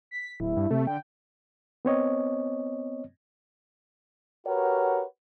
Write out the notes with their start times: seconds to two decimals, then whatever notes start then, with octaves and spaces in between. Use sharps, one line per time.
0.11 B6
0.40 D1 E4
0.57 G2
0.71 C3 A3
0.87 D3 G5
1.85 B3 C4 C#5 D#5
4.46 F#4 G4 A#4 B4 C#5 F#5